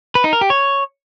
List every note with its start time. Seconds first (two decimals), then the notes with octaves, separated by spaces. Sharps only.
0.15 B4
0.24 D#4
0.33 A#4
0.41 G4
0.50 C#5